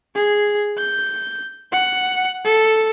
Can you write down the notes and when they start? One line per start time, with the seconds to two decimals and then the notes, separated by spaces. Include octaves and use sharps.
0.15 G#4
0.78 G6
1.72 F#5
2.44 A4